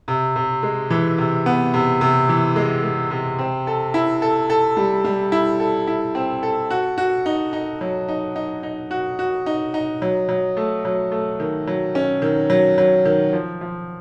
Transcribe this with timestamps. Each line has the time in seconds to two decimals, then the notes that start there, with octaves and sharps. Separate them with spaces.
0.08 C3
0.36 C3
0.63 G#3
0.90 E3
1.18 C3
1.46 B3
1.74 C3
2.01 C3
2.29 E3
2.56 G#3
2.84 G#3
3.11 C3
3.39 C4
3.67 A4
3.94 E4
4.22 A4
4.50 A4
4.77 G3
5.04 G3
5.32 E4
5.60 A4
5.87 E4
6.15 C4
6.43 A4
6.70 F#4
6.98 F#4
7.26 D#4
7.53 D#4
7.81 F#3
8.09 D#4
8.36 D#4
8.63 D#4
8.91 F#4
9.19 F#4
9.46 D#4
9.74 D#4
10.02 F#3
10.29 F#3
10.57 A3
10.85 F#3
11.12 A3
11.40 D#3
11.67 F#3
11.95 C#4
12.22 D#3
12.50 F#3
12.78 F#3
13.05 D#3
13.33 F3
13.61 F3